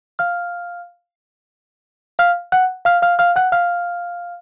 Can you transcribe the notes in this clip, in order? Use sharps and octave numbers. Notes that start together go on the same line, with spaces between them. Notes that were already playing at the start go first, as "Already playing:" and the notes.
F5 F6
F5 F6
F#5 F#6
F5 F6
F5 F6
F5 F6
F#5 F#6
F5 F6